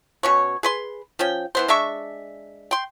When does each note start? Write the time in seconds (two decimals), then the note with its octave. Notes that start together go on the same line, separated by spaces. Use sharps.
0.23 B2 C#4 C#5
0.63 G#4 B4 C6
1.19 F3 C#4 G5
1.55 E3 B3 C5
1.68 G#3 D4 E5 C#6
2.71 G5 C6